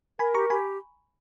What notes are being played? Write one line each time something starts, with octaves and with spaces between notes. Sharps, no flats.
A#4 G#5 B5
G4 A#5 C#6
G4 G#5 B5